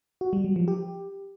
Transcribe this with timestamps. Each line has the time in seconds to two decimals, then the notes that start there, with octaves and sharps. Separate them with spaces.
0.21 F#4
0.33 G3
0.44 F#3
0.56 F3
0.68 G4